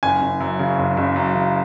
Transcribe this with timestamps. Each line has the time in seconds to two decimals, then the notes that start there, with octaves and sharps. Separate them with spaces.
0.03 F#1 G#5
0.22 F#1
0.40 F#2
0.59 C#3
0.79 F#1
0.97 F#1
1.16 F#2
1.35 C#3